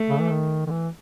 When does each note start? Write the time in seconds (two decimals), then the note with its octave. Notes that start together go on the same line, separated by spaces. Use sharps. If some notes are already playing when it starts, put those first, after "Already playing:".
Already playing: A3
0.09 C#3
0.20 E3
0.30 D#3
0.67 D#3
0.70 E3